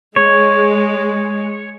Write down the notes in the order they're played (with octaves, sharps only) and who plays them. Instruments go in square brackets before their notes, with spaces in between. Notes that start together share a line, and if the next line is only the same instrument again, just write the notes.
[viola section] G#3 [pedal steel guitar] C#5